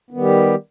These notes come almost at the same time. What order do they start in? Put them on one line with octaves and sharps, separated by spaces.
B3 D#3 G3 G4